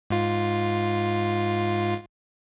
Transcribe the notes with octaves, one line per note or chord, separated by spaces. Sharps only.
G#2 F4